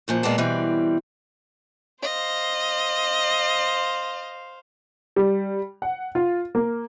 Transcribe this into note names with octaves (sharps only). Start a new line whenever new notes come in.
F#2 A#2 F3
A#2 G#3 A#3 B3 D5 A5
B2 E3 G3 C4
C5 D#5 F5
G3
F#5
F4
A#3